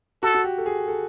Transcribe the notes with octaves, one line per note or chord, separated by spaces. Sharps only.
F#4 A4
F#4
G4
A4
G#4
A4